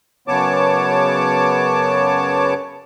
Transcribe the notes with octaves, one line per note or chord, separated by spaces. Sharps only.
F#2 C#3 B3 C#5 A5 D6